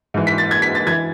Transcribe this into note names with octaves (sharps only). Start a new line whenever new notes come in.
G#2 E3
B6
A6
G#6
B6
A6
E3 G#6